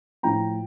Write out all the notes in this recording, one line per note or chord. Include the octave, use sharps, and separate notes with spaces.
A2 F3 G5 A#5